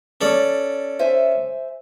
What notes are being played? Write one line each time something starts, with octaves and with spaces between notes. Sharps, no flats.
C#4 A4 D5
C5 E5 G#5